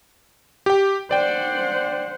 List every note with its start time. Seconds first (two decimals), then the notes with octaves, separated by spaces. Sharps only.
0.66 G4 G5
1.11 C5 D5 F#5 G5